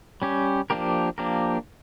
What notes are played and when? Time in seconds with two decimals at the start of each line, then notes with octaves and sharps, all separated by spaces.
0.22 G3 C#4 G4
0.70 F3 A#3 D4 G4 A#4
1.18 F3 A#3 D4 G4 A#4